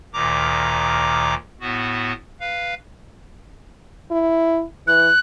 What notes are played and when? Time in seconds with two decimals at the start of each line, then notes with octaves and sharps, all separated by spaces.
0.14 D2 A#2 D#3 A#5 D6
1.61 A2 B3 F#4
2.40 B4 F5
4.11 E4
4.87 E3 F#6